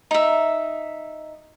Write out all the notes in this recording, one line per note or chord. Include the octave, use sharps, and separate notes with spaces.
D#4 E5